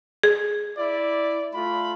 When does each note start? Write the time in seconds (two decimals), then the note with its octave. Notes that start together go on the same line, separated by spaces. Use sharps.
0.23 G#4
0.78 E4 D5
1.54 A3 F4 B5